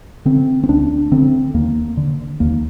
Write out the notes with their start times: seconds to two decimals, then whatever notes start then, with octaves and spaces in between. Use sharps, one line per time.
0.25 D3 C4
0.64 C4
0.69 D2 D4
1.12 D3 C4
1.54 D#2 A#3
1.97 D3
2.40 D#2 A#3